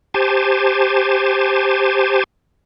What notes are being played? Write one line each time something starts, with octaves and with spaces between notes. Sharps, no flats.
G4 C5 G#5 A5